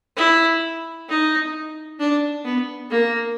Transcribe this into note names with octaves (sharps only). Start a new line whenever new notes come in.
E4
D#4
D4
B3
A#3